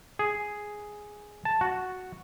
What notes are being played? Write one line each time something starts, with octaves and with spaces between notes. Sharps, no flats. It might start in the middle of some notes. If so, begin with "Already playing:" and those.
G#4
A5
F#4